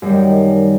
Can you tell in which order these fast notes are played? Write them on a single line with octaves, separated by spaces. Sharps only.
F#2 G3 D#3